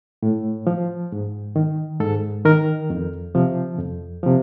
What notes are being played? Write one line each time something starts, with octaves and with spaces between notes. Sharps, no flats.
A2
F3
G#2
D#3
G#2 A4
D#3 A#4
F2
C3 F3
F2
C3 F3